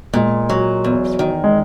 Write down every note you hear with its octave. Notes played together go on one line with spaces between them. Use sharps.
A#2 G#3
F#3
E2
D#3
G#3